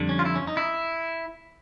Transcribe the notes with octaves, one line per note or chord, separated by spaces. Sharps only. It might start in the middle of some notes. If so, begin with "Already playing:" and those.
Already playing: F2 D3 G3
C#4
F4
E4
C#4
D#4
E4